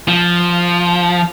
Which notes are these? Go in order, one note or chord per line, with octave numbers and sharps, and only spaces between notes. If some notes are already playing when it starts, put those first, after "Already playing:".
F3